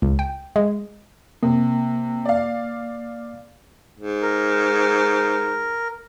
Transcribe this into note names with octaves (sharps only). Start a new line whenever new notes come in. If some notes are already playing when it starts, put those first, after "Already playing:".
C#2
G5
G#3
C3 A#3
D5 F5
G#2
A#4